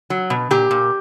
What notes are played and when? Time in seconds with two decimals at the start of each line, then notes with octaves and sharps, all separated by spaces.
0.10 F#3
0.30 B2
0.51 A#2 G4
0.71 A#2